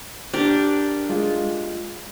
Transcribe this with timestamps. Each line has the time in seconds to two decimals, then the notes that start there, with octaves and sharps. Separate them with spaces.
0.33 D4 G4 A#4
1.09 G#3 F4